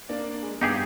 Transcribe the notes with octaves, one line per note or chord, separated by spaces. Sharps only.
A#3 D4 D5
G#3
G2 B3 D#4 G4 G#4